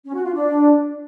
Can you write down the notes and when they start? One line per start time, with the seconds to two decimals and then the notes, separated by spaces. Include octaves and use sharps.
0.05 C#4
0.14 F#4
0.24 F4
0.34 D4